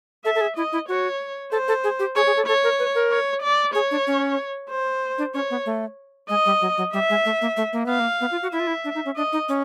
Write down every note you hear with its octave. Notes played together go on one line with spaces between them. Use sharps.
A4 E5
A4
G#4
E4 D#5
E4
F#4 C#5
A4 C5
A4
G#4
G4
G#4 C#5
G#4
A4
A4 C#5
A#4
B4
A#4
C#5
D5
G#4 C#5
D4
C#4
C5
D4
C#4 C#5
B3
A3
G#3 D#5
G3
F#3
F#3
G3 E5
G#3
A3
A#3
A3
A#3
B3 F5
A#3
B3
F4
F#4
E4 E5
F4
E4
D4
D#4
C#4
D4 D#5
D#4
C#4